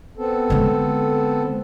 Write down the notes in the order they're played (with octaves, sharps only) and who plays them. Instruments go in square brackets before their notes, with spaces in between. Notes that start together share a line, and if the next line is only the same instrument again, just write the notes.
[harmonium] B3 C4 A4
[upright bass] D3 G#3